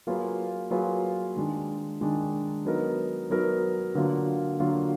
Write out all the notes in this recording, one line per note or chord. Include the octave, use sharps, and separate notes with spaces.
F#3 A#3 F4 G#4 B4
F#3 A#3 F4 G#4 B4
D#3 G#3 D4
D#3 G#3 D4
F#3 B3 D#4 A#4
F#3 B3 D#4 A#4
D3 F#3 A#3 F4
D3 F#3 A#3 F4